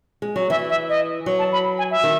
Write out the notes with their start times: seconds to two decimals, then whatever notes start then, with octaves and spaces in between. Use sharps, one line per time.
0.22 G#3
0.36 F#3
0.50 E3 E5
0.70 E5
0.89 D#5
1.26 F#3
1.39 A5
1.52 B5
1.78 G#5
1.91 E5
2.04 D#3